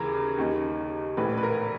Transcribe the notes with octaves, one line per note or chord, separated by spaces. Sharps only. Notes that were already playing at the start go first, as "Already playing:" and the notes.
Already playing: D#2 C#3 E3 A#4
D#2 D#3
A#1 A2 E3 B4
B4
A#4